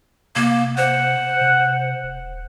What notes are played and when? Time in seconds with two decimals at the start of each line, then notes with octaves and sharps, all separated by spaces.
0.36 C3 A#3
0.78 C5 F#5
1.41 C3
2.03 D#1